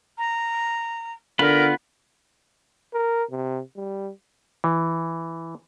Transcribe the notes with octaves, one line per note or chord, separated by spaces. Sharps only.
A#5
D3 B3 F4 A#4 B5
A#4
C3
G3
E3